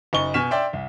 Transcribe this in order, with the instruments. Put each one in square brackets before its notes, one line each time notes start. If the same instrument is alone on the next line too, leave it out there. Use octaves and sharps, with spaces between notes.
[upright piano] F#1 D#4 C#6 G7
B2 G#5 C#6 F6 B6 E7
D5 E5 G5 C6
C2